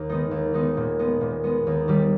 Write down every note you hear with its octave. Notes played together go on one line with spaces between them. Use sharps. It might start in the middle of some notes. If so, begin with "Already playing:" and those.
Already playing: D#2
D#3 G#3 B3 D#4
D#2
D#3 G#3 B3 D#4
A#2
G#3 B3
A#2
G#3 B3
D#2
D#3 G3